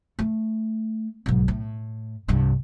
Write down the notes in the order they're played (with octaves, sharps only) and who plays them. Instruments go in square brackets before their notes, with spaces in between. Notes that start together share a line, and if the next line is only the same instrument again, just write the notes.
[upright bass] A3
B1 G#2
A2
C2 G2